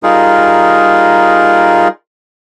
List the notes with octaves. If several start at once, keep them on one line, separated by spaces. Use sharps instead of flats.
G3 D#4 F4 G#4 A#4